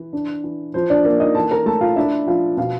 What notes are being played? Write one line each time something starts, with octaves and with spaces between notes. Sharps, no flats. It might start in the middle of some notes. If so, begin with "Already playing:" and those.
Already playing: E3
D4
E3
F3 C5
D4 D5
A#3
D#4 D#5
E3 A4 A5
A#4 A#5
A3 A4 A5
F4 F5
D4 E4 E5
F3 F4 F5
B2 F4 F5